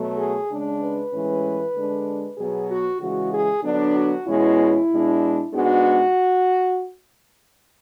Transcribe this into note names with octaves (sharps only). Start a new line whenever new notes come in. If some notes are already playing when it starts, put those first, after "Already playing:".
Already playing: B2 F#3 A3
G#4
C#3 G#3 D4
B4
A2 E3 G#3 C#4
D3 G#3 D4
B2 F#3 B3 G#4
F#4
C#3 E3 G#3 F#4
G#4
D3 F#3 B3 D4
F#4
E2 B2 G#3 C#4 E4
B2 G#3 D4
G#2 G#3 B3 D4 F#4